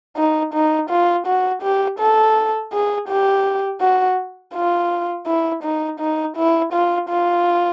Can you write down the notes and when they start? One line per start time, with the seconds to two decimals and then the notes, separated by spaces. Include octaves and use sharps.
0.17 D#4
0.54 D#4
0.90 F4
1.26 F#4
1.62 G4
1.99 A4
2.73 G#4
3.08 G4
3.81 F#4
4.55 F4
5.27 E4
5.63 D#4
6.00 D#4
6.36 E4
6.73 F4
7.09 F4